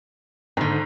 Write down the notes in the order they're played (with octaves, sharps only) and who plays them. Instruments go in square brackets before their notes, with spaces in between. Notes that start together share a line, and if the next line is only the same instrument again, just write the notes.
[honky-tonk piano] G#2 [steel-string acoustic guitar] D3 D#3